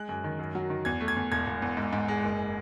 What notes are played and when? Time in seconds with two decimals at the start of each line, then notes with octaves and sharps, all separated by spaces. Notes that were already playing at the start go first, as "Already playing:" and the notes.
Already playing: G#3 F#6
0.09 F#2
0.24 D#3
0.39 F#2
0.55 F#3
0.70 D#3
0.85 E2 G#6
1.01 A3
1.08 G#6
1.17 E2
1.31 E1 G#6
1.47 E1
1.62 E2
1.77 G#2
1.93 G#2
2.08 G#3
2.23 F#1